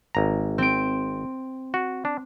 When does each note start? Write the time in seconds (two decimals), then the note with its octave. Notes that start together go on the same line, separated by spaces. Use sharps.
0.15 G#1 A#5
0.58 C4 D7
1.74 F#4
2.05 D4